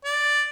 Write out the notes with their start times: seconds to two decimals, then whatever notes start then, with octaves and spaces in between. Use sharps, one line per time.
0.05 D5